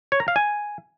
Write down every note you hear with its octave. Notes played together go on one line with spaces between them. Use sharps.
C#5
A#5
F5
G#5